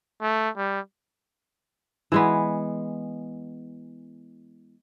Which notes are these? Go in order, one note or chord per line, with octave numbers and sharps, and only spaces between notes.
A3
G3
E3 G#3 B3